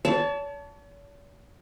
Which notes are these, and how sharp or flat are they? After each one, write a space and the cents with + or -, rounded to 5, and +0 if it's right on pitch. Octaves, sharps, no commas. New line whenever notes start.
C#5 +45 A5 +0